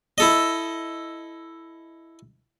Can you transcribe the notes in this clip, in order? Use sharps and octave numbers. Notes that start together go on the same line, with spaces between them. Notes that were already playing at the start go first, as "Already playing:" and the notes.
E4 A4 D#5